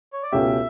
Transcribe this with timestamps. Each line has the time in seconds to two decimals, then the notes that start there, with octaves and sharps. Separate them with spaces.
0.13 C#5
0.23 D5
0.32 C#2 B2 A3 C#4 G4 E5